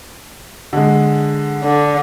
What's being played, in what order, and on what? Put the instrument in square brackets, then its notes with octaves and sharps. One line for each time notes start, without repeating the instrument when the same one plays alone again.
[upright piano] D3 G#3
[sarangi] D3